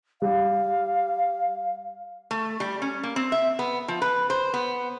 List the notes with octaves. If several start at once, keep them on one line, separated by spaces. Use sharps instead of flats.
G3 F5
A3
G3
C#4
A#3
C4
E5
B3
F3
B4
C5
B3